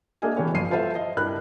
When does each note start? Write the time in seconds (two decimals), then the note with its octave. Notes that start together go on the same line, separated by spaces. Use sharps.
0.22 A#3 D4 G#4 D#5 E5 G#5
0.37 E3 B3 G4 C#5
0.54 G1 F3 C7 D#7
0.71 F4 A4 C5 E5 F5
0.95 D#5
1.17 G2 E4 A#4 F#6